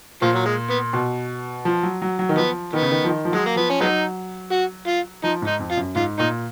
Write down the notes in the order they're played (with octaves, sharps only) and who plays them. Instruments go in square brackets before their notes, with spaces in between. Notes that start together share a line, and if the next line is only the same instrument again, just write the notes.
[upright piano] A#2 [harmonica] F3
[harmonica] F#3
G#3
B3
[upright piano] B2
F3
F#3
F#3
F#3
D#3
[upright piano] F3 [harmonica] B3
[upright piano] D#3 [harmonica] B3
[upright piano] C#3
D#3
F3
D#3
F3
[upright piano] F#3 [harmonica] G#3
[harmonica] A#3
[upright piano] F3 [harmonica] B3
[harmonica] C#4
[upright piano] F#3 [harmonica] G#3 B3 D#4
[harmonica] F#4
F4
[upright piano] F3 [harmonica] D#4
[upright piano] G#2 [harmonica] D#4
[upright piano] F2
[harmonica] F4
[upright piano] F#2
[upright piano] G#2 [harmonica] F4
[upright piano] A#2 [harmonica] D#4